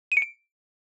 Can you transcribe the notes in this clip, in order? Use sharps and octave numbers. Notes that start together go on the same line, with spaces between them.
D#7
C#7
D7